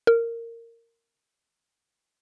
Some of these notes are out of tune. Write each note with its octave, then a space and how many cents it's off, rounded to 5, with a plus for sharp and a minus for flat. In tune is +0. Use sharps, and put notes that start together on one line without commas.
A#4 -15